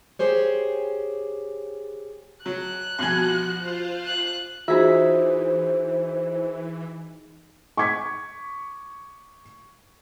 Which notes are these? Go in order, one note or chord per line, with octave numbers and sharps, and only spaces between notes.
G4 G#4 C5 C#5
F#3 F#6
G2 B2 F3 F#4 G#5
F4 C5 F5
F#6
E3 D#4 F4 F#4 G#4 C5 E5
C#6 D6 G#6 B6